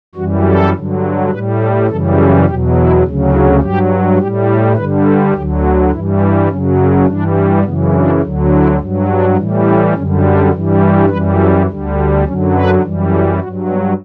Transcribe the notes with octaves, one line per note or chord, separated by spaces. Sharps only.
F#2 E3 G3 F#4
A4
G2 D3 F#3
A2 G3 B4
A4
F#2 C#3 E3 G3 A4
A4
E2 B2 F#3 G4
E4
D2 C#3 F#3
E4
G2 F#3 G4
A2 G3 G4
G4
G2 D3 G3 B4
A4
D2 D3 F#3 G4
F#4
G2 E3 G3 E4
D4
F#2 C#3 F#3 C#4
C#4
G2 E3 G3 D4
F#2 C#3 E3 B3
D4
D2 D3 F#3
E4
G2 F#3
D4
A2 E3 G3
C#4
F#2 D3 G3 C#4
D4
G2 E3 G3
D4
F#2 E3 G3 B4
A4
D2 D3 G3
F#2 D3 F#3 C#4
B4
F#2 E3 G3
A4
G2 F#3 F#4
B3